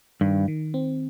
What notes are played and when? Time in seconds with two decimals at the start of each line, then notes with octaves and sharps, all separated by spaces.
0.21 G2 D#3
0.48 D#3
0.74 C4